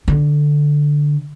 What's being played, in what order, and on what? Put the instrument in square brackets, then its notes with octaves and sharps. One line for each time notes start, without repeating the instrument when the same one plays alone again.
[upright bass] D3